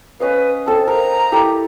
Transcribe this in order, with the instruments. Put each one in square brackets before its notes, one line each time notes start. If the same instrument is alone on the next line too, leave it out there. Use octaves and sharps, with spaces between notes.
[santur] C#4 D#5 F5 [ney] B4
[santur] C4 A4 [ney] A5
[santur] A#4 F5 A5 [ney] A#5
[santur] E4 G4 A4